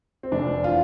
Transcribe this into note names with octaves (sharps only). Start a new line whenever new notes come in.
C4
F1 D4
E3 F4